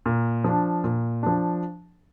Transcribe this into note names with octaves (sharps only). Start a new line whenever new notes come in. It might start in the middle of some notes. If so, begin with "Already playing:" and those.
A#2
F3 D4
A#2
F3 D4